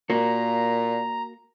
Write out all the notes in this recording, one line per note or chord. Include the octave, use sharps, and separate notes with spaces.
A#2 A#3 F#4 A#5